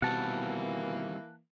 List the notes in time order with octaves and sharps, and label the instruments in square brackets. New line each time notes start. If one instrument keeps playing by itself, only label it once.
[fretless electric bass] B2 [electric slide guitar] D#3 G3 C4 [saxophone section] E3 A#3 [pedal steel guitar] F#5 A5